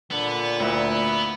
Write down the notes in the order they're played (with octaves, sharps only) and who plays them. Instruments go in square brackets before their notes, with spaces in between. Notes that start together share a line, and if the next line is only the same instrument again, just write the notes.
[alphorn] A#2 [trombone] D3 [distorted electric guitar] B3
[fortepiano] D2 [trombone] E4